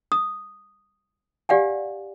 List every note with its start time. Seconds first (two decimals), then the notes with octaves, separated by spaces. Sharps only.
0.12 D#6
1.49 G4 D5 F5 F#5 G#5